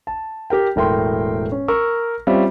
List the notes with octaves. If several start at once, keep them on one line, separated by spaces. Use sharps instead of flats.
A5
G4 A#4 G5
E1 A2 A#4 G5 C6
C#4
A#4 C#6 E6
G3 C4 C#4 F4 E5